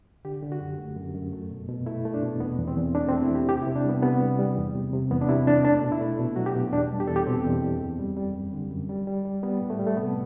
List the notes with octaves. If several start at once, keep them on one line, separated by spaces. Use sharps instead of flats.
D3 G4
D3
F#4
F#2
A3
F#2
F#2
A3
B2
B2
A3 E4
A3
D4
B2
E2 B3
E2
C4
E2
A3 D4
C4
A3
E4
E2 G4
C3 G4
E4
C3
D4
G3 B3
C3 B3
G3
G3
E2
C3
C3
E2 B3
D4
C3 E4
E2 D4
A3 D4
B2
E4
A3
B2
F#3 F#4
G4
B2
E2 D4
G3
G4
E2 A4
G4
B2 C4
E2
E2
F#2
G3
G3
F#2
D3
F#2
G3
G3
G3
G3 B3
A2
A3
G3
A3
C3 B3